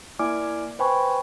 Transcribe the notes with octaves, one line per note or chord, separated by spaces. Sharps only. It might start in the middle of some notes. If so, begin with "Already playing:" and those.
A#3 E4 D5 G#5 D6 F6
B4 C5 G5 G#5 B5 C#6